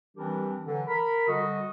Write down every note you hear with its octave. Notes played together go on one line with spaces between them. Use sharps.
E3 G3 C4 D4 G4 A#4
D3 E3 F#3
A#4 B5
D3 G3 F#4 D#5 D#6